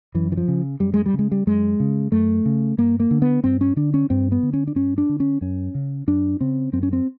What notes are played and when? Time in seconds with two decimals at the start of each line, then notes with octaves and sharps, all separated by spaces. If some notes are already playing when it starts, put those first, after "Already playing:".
0.15 F#2 E3
0.32 E3
0.37 F3
0.48 C#3
0.80 F#2 G3
0.94 G#3
1.06 G3
1.13 C#3
1.19 G#3
1.32 G3
1.47 F#2 G#3
1.80 C#3
2.12 F#2 A3
2.45 C#3
2.78 G2 A#3
3.00 A#3
3.11 D3
3.22 B3
3.44 G2 C4
3.61 C#4
3.76 D3 D4
3.94 C#4
4.10 G2 C4
4.32 B3
4.43 D3
4.53 C#4
4.67 D4
4.75 G2 C#4
4.98 D4
5.09 D3
5.20 C#4
5.41 F#2 C#4
5.75 C#3
6.07 F#2 D4
6.41 C#3 C4
6.73 F#2 C4
6.83 C#4
6.93 C4